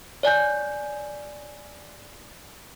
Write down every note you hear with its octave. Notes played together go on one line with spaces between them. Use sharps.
C#5 D5 G#5 G6